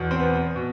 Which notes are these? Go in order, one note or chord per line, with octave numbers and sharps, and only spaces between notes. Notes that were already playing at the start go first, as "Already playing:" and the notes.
Already playing: E2 B2
C4
B3
B2